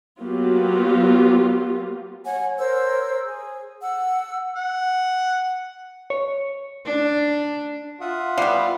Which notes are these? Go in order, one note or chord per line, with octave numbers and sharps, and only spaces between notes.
F#3 A#3 B3 F4 G4
C#5 F#5 G#5
A#4 C5 C#5 E6
G#4
F#5 E6
F#5
C#5
D4
F4 E5 F#5 D#6
G3 B3 F5